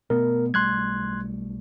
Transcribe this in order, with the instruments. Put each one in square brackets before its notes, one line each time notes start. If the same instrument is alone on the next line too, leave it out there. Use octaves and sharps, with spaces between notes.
[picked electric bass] B2 A3 B3 [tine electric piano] A#4
[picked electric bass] B1 G3 A3 [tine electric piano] C6 F#6 G#6